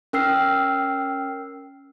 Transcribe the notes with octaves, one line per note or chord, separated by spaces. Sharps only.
C#4 A#4 G5 E6 F6 C7